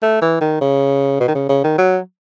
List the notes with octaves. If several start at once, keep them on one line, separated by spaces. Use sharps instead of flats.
A3
E3
D#3
C#3
B2
D#3
C#3
C#3
D#3
F#3